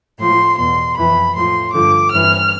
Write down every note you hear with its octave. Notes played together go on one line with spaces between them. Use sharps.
A2 F3 C6
E2 B2 C6
F2 E3 B5
A2 F3 C6
G2 D3 F3 D6
G2 E3 F6